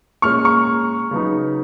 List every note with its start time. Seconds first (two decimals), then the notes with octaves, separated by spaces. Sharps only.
0.22 A#2 G#3 C#4 C#6 F6
0.45 A#5 C#6
1.11 C#3 F#3 B3 D#4